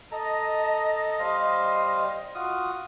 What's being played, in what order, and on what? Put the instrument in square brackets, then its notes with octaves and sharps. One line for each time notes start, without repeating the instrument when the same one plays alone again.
[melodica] A4 A#5 [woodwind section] D#5
[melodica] G3 C5 F5
F4 F#4 D#6